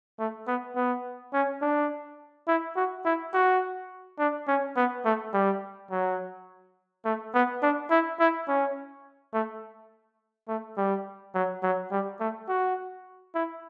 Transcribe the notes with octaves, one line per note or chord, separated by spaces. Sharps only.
A3
B3
B3
C#4
D4
E4
F#4
E4
F#4
D4
C#4
B3
A3
G3
F#3
A3
B3
D4
E4
E4
C#4
A3
A3
G3
F#3
F#3
G3
A3
F#4
E4